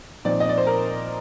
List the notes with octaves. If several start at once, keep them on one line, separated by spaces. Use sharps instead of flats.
A#2 F3 C4 D#4 D5
D#5
D5
C5
A#4